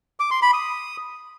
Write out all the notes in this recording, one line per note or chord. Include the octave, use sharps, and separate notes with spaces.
D6
C6
B5
D#6